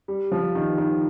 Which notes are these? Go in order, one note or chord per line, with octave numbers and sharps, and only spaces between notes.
G3
F3
D#3
D#3